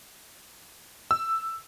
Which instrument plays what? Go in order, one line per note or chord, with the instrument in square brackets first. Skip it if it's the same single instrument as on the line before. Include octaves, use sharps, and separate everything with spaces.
[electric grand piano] E6